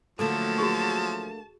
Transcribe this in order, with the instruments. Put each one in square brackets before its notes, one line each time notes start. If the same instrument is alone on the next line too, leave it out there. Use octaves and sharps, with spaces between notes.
[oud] D3 A3 A#3 [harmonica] F3 F#3 [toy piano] A4 [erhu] A5
[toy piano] F#4 G#4 C#6